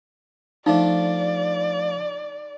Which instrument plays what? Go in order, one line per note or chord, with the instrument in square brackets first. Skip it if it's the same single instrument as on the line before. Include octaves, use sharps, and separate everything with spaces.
[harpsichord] F3 A3 D4 [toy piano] D#4 [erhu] D5